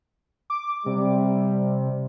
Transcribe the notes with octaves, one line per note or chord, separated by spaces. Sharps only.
D6
C3 G3